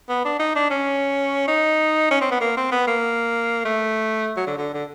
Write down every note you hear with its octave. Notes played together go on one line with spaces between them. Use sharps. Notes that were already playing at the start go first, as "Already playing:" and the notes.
B3
D4
D#4
D4
C#4
D#4
C#4
C4
B3
A#3
C4
B3
A#3
A3
F#3
D3
D3
D3